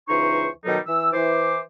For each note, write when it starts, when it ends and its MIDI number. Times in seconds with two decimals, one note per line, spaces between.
0.08 0.47 37
0.08 0.47 52
0.08 0.47 63
0.08 0.47 72
0.08 0.47 85
0.65 0.78 47
0.65 0.78 51
0.65 0.78 54
0.65 0.78 55
0.65 0.78 63
0.65 0.78 69
0.86 1.10 52
0.86 1.10 88
1.13 1.59 52
1.13 1.59 72
1.13 1.59 86